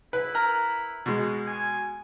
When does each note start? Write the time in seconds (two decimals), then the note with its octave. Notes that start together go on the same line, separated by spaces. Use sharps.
0.13 E4 B4
0.35 A#4
1.06 B2 G#3
1.47 G#5